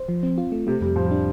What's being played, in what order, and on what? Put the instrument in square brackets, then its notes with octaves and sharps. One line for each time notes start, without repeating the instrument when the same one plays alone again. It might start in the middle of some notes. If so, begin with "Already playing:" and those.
Already playing: [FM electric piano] C5
F3
C4
F4
A3
[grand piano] C3 [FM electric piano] A3
[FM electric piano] F2 [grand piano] G3
[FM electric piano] A2 [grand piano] F3
[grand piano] G3
[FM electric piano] D4